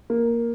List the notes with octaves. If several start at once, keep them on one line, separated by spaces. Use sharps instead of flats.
A#3